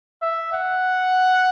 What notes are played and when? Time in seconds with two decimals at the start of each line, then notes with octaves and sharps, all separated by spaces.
0.22 E5
0.53 F#5